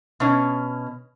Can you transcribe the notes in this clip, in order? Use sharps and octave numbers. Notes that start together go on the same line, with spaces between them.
B2 C#4